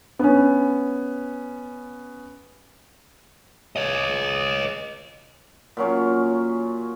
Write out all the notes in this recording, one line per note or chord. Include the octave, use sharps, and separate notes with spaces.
B3 C#4
C#5 D#5
A#2 F#3 C#4